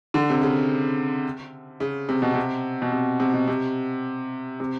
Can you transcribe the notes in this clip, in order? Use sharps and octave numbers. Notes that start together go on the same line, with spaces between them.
D3
C3
C#3
C#3
C3
B2
C3
B2
C3
C3
B2
C3
C3